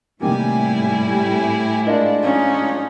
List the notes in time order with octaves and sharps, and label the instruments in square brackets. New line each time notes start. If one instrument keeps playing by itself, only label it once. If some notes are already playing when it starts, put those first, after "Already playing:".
[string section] A2 E4 [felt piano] C3 D#3 A#3 [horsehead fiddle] G3 [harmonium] G4 G#5
[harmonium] G#3 D4 F4 [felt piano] A#4 D5 D#5
[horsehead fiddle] C#4 D#4